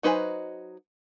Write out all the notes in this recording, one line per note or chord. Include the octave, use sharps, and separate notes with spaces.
F#3 D#4 B4 C5 G#5